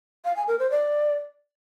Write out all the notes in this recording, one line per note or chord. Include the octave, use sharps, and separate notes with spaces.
F5
G#5
A#4
C5
D5